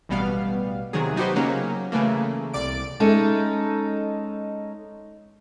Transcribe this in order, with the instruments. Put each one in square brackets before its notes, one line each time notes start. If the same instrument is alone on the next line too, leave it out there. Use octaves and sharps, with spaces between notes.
[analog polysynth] A1 B2 G3 B3 F5
C3 D#3 F#3 G#4
B3 D#4 F#4 G4 C5
C#3 F#3 A#3 C#4
C#3 E3 A3 A#3
C2 D5 D7
[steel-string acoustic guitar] G#3 C#4 D#4 A4